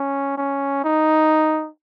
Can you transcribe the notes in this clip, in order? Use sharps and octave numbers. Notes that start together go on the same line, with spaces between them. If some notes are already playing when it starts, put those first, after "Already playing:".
Already playing: C#4
C#4
D#4